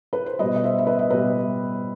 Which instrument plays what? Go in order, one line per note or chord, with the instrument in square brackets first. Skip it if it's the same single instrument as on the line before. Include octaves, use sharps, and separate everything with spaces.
[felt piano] B4
C5
B2 G3 B4 D#5
D#5
C5 E5
E5
B4 D#5
E5
B2 G3 B4 D#5